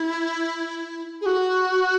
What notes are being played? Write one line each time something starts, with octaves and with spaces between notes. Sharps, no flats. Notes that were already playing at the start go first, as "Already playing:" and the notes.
Already playing: E4
G#4
F#4